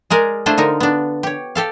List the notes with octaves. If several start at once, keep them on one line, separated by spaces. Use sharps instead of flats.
G#3 G#4 A#4 D5
A3 D4 E4 F4 C5
D3 D#4 A#4
B3 D4
G4 C#5
G4 A4 F5